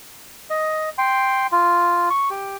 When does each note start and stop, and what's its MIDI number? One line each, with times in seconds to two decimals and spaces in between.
0.50 0.89 75
0.98 1.47 79
0.98 1.47 84
1.52 2.09 65
2.10 2.29 85
2.30 2.57 67